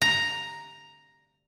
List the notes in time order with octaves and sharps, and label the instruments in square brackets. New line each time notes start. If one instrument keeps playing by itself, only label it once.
[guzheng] A#5